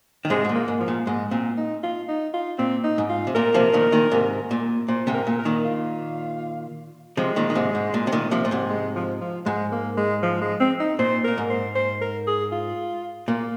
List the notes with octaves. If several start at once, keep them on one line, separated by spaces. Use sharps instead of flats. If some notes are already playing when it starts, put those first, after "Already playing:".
D#3
G#2 C3 G#3
G#2
A#2
A#3
G#2
F3
A#2
G#2 G#3
A#2 C4
D#4
F4
D#4
F4
A#2 C4
D#4
G#2
F4
C3
A#2 A#4
C3 F3
A#2 D#3
A#2 D#3
G#2 C3
A#2
A#2 C5
G#2 C3
A#4
A#2
A#4
A#2 D#3
F4
C3 F3 G#3
A#2 D#3
D#3
G#2 C3
G#2
A#2
C3
A#2 D#3
C3 F3
A#2
G#2 C3
G#3
F3
F3
G#2 G#3
A#3
G#3
F3
G#3
C4
D#4
A#2 C5
A#2 A#4
G#2
C5
C5
A#4
G#4
F4
A#2 A#3